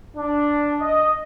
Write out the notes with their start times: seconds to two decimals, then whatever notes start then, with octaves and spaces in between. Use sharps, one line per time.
0.17 D4
0.80 D#5